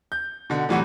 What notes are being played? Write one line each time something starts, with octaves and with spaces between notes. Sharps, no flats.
G6
B2 D3
A2 C3 E3 F#3 G3 F#4